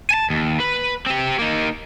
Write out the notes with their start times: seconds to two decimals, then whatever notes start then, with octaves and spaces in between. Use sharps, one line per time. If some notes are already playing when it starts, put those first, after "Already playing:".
0.11 G#5 A5
0.30 D#2
0.60 B4
1.06 C4 G4
1.39 A#3 D#4